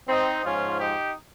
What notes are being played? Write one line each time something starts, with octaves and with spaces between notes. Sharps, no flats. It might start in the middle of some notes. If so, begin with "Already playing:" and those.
C4 D#4
G#2 F3 C#4 F4
D#4 G4